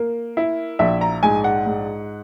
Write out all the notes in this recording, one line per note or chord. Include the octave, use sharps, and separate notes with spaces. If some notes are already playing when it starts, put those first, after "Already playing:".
Already playing: A#3
E4
A#1 E5
A#5
G#2 G#5
F#5
G#2